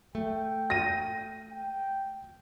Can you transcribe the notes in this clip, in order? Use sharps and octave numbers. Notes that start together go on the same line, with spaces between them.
A3 G5
A#6 D#7
G5